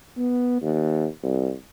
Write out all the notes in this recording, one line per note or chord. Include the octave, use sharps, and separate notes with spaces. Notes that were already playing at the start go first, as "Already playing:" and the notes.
B3
D#2
C2